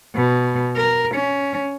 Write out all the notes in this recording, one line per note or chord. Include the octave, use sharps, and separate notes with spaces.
B2
A#4
C#4